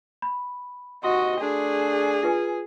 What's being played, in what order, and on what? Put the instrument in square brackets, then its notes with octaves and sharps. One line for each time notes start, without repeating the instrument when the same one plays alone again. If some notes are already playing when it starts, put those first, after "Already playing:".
[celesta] B5
[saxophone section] D#2 C3 D#5 [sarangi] F#4 [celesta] C6
[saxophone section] A3 D4 [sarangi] G#4
[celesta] F4 B4 G#5